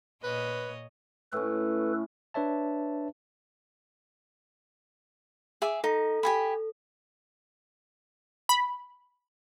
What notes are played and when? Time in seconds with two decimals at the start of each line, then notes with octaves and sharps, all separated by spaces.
0.23 A#2 B4 C#5 D#5
1.33 A2 C#4 A4 B4
2.34 D4 B4 C#5 E5 A5
5.62 G#4 E5 D6
5.84 D#4 A4
6.23 G4 G#5 B5
8.49 B5